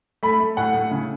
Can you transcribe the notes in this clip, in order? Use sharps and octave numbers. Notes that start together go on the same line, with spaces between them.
A3 B5
A3
A2 F#5
A2
C#3